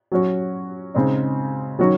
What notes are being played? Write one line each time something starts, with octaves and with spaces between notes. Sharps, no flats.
F#3 C#4 F#4
C#3 G#3 C4 D#4
D#3 F#3 C#4 F#4